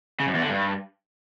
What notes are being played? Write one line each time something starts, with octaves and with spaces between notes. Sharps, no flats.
C#3
F#2
E2
D3
G2